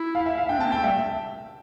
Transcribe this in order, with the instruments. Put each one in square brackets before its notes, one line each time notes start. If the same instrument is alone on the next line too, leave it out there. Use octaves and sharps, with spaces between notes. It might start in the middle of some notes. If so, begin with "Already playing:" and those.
Already playing: [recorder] E4
[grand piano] F5
E5
F5
[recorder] D4 [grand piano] G5
[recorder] C4 [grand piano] A5
[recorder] A#3
[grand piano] G5
[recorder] A3
[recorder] G3 [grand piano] E5